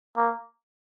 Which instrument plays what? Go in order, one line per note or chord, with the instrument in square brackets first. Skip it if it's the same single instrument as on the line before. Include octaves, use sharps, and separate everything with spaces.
[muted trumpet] A#3